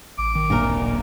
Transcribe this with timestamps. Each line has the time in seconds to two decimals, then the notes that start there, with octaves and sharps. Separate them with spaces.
0.18 A1 D6
0.35 D#3
0.50 D1 A#2 A#3 D4 A#4